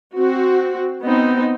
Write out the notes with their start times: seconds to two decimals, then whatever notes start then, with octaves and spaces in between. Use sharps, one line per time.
0.14 C4 F#4
1.03 B3 C4 D#4